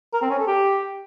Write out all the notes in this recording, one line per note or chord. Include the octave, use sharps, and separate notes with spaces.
A#4
C4
C#4
A4
G4